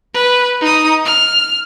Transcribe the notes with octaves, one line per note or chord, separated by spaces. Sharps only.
B4
D#4 D#6
F6